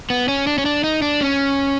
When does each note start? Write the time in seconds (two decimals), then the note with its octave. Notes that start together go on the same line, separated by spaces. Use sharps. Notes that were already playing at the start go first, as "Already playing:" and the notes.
0.10 B3
0.28 C#4
0.47 D4
0.58 C#4
0.65 D4
0.84 D#4
1.02 D4
1.21 C#4